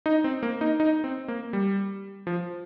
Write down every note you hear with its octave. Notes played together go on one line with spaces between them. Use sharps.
D#4
C4
A#3
D#4
D#4
C4
A#3
G3
F3